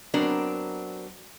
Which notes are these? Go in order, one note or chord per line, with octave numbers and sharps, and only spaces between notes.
F#3 B3 C4 D4 A#4 D5